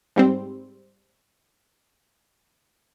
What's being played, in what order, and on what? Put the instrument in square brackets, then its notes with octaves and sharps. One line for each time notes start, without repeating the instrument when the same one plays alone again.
[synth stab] G#2 G3 C4